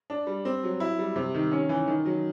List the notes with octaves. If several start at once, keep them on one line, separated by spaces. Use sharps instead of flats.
D4
G3
C4
F#3
E4
G3
C3
D#3
C#4
E3
D#3
F#3